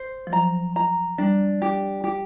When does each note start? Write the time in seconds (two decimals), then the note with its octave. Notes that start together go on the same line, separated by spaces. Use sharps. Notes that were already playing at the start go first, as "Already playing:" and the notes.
Already playing: C5
0.27 F3
0.33 F#3 A#5
0.76 A#5
1.18 G3 D4
1.62 G4
2.04 G4